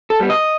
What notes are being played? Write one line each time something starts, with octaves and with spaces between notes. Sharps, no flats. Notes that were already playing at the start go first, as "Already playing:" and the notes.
A4
G3 B3
D#5